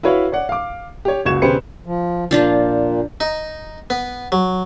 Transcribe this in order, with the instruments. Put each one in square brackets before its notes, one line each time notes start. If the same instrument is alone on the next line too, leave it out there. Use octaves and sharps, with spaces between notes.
[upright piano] E4 F#4 B4 C#5 F5
C#5 D5 F#5
F5 D6
G4 C#5
F#1 C#2 F#4 C#6 G#6 E7
E1 C#3 G4 B4 C5 C#7
[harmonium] F3
[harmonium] A#2 [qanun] F3 D4 F4
[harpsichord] D#4
B3
F#3